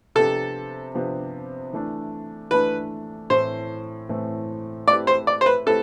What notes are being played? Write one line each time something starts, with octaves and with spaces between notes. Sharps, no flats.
C3 F3 B3 D4 G4 A4
C3 F3 B3 D4 G4
E3 A3 D4
E3 A3 D4 B4
A2 E3 A3 C4 C5
A2 E3 A3 C4
A3 C4 E4 G4 B4 D5
C5
D5
C5
B4
A3 C4 E4 G4 A4 B4